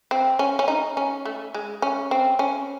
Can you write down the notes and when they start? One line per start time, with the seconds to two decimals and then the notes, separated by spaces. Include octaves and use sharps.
0.11 C4
0.39 C#4
0.59 C#4
0.68 D#4
0.97 C#4
1.25 A3
1.54 G#3
1.82 C#4
2.11 C4
2.39 C#4